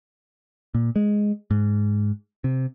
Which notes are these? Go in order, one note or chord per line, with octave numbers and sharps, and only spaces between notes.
A#2
G#3
G#2
C3